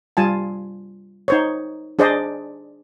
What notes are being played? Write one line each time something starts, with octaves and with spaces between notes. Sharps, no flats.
G3 F4 G#5 A5
D#4 C5 C#5
D4 G#4 C5 D5 D#5